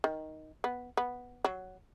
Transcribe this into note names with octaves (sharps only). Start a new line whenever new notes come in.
D#3
B3
B3
F#3